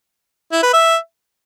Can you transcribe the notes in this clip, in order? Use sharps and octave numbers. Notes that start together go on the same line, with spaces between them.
E4
B4
E5